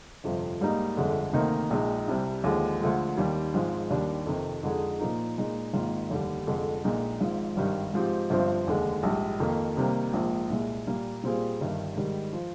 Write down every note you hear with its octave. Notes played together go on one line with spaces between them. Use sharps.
G1 F2 C3 F3
G#2 G3 A#3 D#4
G1 F2 D3 G#3 D4
D2 C3 D#3 A#3 D#4
A#1 A#2 G#3 D#4
C2 C3 G3
D#2 D3 F3 G#3
D2 D3 F3 G#3
D#2 D#3 G3
G#1 G#2 F3 G#3
D#2 D#3 G3 D4
F2 C3 D#3
F2 D3 G#3 D#4 G#4
A#2 F3 A#3 D#4
A#2 G#3 D#4
G#1 G#2 D#3 A#3 F4
F1 D#2 D3 G3
F1 F2 D3 G#3
A#1 A#2 G#3 D#4
G#1 G#2 F3
G#1 G2 D#3 G3
G#2 F3 C4 G4
G1 G2 F3 C4
F1 D#2 D3 G#3
A#1 G#2 G3
F2 D#3 A#3
C3 D#3 G3 A#3
A#1 G#2 F3 A#3
C2 A#2 G#3
A#2 G3 A#3
A#2 G3 C4 F4 G#4
G1 G2 D#3 G3
G#2 D#3 G3
F3